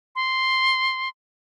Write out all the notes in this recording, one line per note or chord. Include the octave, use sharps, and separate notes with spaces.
C6